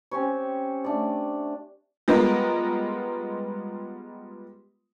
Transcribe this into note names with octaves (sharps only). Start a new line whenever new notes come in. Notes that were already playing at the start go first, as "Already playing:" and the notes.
C4 C#4 G4 C#5
A3 D4 D5
G3 G#3 B3 F4 A#4